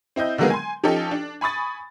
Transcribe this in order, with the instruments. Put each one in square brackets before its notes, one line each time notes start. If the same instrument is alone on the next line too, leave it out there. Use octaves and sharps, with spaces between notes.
[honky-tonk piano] C4 E4 D#5 G6
D3 D#3 F#3 G#3 A#3 B3
G#5 C6
F3 C#4 D#4 G4 A4
D4
G#5 B5 C#6 D#6 A6